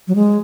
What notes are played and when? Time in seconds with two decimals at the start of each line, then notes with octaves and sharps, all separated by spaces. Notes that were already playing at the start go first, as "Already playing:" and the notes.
0.08 F#3
0.15 G#3